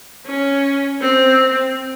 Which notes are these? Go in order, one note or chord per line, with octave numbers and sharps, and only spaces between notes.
C#4
C4